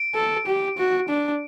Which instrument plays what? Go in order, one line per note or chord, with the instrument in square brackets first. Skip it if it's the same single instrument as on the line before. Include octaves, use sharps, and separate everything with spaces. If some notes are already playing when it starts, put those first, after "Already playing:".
Already playing: [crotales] D7
[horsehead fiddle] A4
G4
F#4
D4